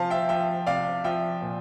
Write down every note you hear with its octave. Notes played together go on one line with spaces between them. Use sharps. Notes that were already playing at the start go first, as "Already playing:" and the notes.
Already playing: C3 F3 C5 F5 A5
E5 G5
F3 E5 G5
C3 D5 F5
F3 E5 G5
A#2